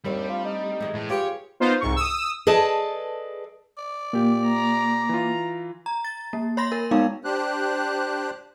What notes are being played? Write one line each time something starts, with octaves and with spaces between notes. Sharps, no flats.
D#2 G3 A3 C4 D4
F4
D#4
E3 G#3 A3
A2
F4 G4 G#4 B4 C#5
B3 D#4 F4 C5
C2 G#2 C#6
D#6 E6
G#4 A4 B4 D5 D#5 A5
D5
A#2 A#3 G4
A#5
E3 F4
A#5
A6
A#3
C#5 B5 C6 A#6
A#4
G#3 B3 D#4 F5
D4 G4 C5 F#6